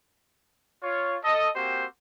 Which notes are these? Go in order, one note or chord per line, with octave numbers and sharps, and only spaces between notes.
F4 C#5
A4 D#5
A#3 C4 F#4 G4 C5